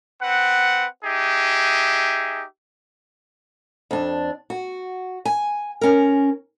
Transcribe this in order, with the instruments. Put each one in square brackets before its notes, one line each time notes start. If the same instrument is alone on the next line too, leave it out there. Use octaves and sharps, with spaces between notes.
[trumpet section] C4 B4 F#5
D#4 G4 G#4 E5
[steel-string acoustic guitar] F2 D4
F#4
G#5
C#4 A#4